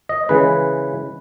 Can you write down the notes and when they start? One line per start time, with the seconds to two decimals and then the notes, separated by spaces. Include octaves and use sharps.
0.09 D#5
0.29 C#3 E3 G#3 B4